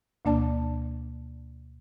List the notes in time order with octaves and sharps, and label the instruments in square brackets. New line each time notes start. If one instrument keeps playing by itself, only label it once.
[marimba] D2 B2 A#3 D4 D5 A5